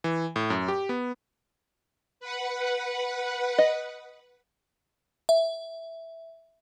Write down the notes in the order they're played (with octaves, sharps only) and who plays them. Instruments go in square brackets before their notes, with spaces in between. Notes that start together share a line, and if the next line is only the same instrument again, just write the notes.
[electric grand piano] E3
A2
F#2
G4
B3
[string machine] B4 F#5
[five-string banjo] D#5
[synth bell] E5